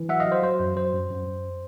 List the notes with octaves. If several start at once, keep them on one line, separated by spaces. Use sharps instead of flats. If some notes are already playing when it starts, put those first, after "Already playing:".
Already playing: E3
F#3 E5 F#5
D#5 F5
F#3
C5
F#3 C5
F#2
F#3 C5
F#2
F#2
F#2